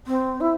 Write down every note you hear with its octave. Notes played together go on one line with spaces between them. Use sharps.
C4
E4